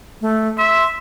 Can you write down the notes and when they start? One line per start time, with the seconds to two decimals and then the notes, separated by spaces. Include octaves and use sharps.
0.21 A3
0.58 E5 C6